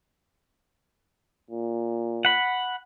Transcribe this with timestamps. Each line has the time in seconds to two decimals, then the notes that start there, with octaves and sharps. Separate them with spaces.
1.51 A#2
2.25 F#5 B5